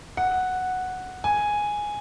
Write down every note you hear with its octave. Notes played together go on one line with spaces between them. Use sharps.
F#5
G#5